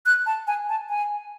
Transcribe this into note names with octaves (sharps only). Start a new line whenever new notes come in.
F#6
A5
G#5
A5
G#5